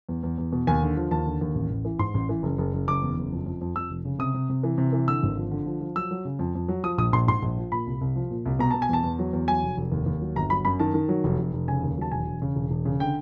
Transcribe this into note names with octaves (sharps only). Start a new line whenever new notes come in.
E2
E2
E2
B2
D#2 G#5
D3
F3
D#2 A5
D3
D#2
A1
A1
E3
G#2 C6
A1
E3
F#1
F#1
F#1
F#1 D6
E2
F#1
F2
F2
F2
F2 E6
F1
C#3
C3 D#6
C3
C3
E3
C3
E3
D3 E6
G#1
F3
D3
F3
F3
F#3 E6
F#3
C#3
F2
F2
F#3
F3 D#6
A#1 D#6
A#1 C6
G#2 C6
A#1
F3
A#2 B5
C2
C2
F3
A#2
C2
B2 A#5
B2 A5
G#5
E2 A5
E2
F#3
E2
F#3 G#5
F1
F1
D#2
D#2
F#3
G1 A#5
F#3 B5
F#2 B5
D#3 A5
D#3
F#3
F1
F1
F1
C#3 G#5
D#2
F#3 A5
E1 G#5
E1
C#3
E1
E1
C#3
D3 G5